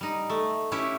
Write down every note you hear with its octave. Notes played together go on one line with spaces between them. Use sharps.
G3 D#4
A3
C#4 E4 G4 B4